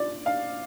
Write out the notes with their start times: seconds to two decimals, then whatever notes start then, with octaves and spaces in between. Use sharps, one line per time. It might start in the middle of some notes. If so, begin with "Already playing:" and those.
Already playing: F3 D5
0.26 F5